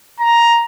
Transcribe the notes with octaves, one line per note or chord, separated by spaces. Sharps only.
A#5